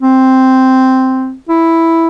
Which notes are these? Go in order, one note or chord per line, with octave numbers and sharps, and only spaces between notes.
C4
E4